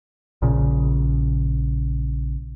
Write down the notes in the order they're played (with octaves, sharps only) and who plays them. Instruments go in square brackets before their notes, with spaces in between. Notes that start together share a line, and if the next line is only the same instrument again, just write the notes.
[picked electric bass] A#1 A#2 C#3